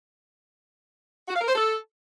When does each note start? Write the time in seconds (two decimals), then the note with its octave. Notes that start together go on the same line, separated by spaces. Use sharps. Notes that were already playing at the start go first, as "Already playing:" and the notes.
1.28 F#4
1.35 F5
1.41 A#4
1.48 C5
1.54 A4